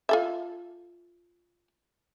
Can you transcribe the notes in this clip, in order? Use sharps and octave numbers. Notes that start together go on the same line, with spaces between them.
F4 A4 E5